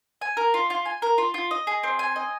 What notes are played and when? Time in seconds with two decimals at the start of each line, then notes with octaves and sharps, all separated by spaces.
0.21 G#5
0.37 A#4
0.54 F4
0.70 F4
0.85 G#5
1.02 A#4
1.18 F4
1.34 F4
1.51 D#5
1.67 G#4
1.83 C4
1.99 G#5
2.16 D#5